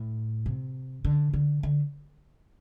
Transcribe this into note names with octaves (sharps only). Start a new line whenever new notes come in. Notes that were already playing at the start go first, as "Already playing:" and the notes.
Already playing: A2
C3
D3
D3
D3